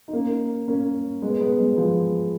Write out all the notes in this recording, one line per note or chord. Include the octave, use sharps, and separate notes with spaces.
D#4
A#3 C#4
A#3 C#4
G#3 B3
G#3 B3
G#3 B3
F3 G#3